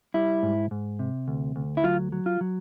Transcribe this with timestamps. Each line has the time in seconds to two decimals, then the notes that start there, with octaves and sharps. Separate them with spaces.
0.14 G3 E4
0.43 G#2
0.71 G#2
0.99 C3
1.28 D2
1.56 D2
1.77 E4
1.84 F#3 F4
2.12 F#3
2.26 F4
2.41 F#3